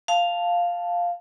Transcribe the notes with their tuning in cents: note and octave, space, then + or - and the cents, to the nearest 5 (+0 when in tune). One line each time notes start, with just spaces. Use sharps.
F5 +0 A5 +0